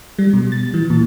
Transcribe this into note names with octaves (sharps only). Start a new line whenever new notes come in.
G3
B2
A6
E3
A#2